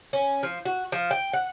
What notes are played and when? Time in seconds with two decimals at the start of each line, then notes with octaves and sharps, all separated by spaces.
0.13 C#4
0.43 F3
0.65 F#4
0.92 F3
1.11 G5
1.34 F#5